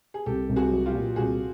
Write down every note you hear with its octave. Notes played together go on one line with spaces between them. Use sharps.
G#4
C2 G4 A4
C2
F#4 G#4
F#3
F4 G4
A#2
C2 F#4 G#4